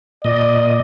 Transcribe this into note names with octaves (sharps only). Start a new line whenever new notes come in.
A#2 D5 D#5